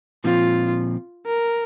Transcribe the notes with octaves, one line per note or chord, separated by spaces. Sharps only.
A#2 F3 C4 F4
A#4